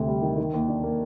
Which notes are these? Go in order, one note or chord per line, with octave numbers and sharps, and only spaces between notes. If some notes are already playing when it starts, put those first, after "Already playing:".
Already playing: D2 C3
G3
D#3
D#3
D#2
D4
A#3